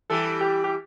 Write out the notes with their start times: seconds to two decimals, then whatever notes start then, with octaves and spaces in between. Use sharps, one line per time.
0.10 E3 G3 A4
0.41 G4
0.64 G4